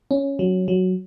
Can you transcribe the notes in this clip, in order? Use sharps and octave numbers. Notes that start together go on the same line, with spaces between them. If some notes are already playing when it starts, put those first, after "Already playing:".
C#4
F#3
F#3